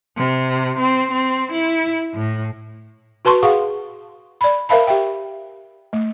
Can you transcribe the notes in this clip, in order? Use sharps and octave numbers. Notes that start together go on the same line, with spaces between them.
C3
C4
C4
E4
A2
F#4 B4 A5 C6 C#6
G#4 F5 F#5 C#6
D5 B5
A#4 C5 E5 F5 A5 B5
G4 E5 G5
A3